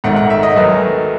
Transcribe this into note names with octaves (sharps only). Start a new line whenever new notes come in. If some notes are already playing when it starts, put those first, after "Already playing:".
G#1 G#2 D#3 A3 F#5
F#5
E5
D#5
F#2 D#3 F#3 A3 B4